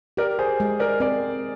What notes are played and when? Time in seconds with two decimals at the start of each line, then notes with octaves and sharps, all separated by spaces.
0.17 G4 A#4 D5
0.39 G#4 C5
0.60 G#3
0.80 A#4 D5
1.00 C4 A#4 D5